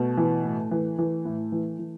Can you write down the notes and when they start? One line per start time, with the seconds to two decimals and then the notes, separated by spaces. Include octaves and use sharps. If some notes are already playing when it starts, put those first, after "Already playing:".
Already playing: B2 A3
0.17 E3
0.44 A2
0.71 E3
0.98 E3
1.25 A2
1.52 E3
1.79 E3